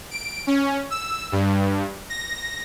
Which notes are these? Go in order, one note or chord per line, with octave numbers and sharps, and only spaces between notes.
D7
C#4
E6
G2
A#6